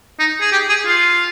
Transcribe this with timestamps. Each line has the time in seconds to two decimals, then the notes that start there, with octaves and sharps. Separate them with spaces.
0.20 D#4
0.41 G#4
0.52 G4
0.69 G#4
0.86 F4